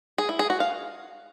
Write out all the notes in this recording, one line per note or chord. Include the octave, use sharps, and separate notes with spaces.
G#4
E4
G#4
F#4
F5